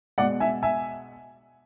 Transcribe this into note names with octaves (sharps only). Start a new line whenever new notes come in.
B2 G#3 D5 F#5
E5 G#5
E5 G#5